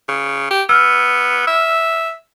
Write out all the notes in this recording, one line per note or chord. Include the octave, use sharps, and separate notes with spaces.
C#3
G4
B3 E6 F6
E5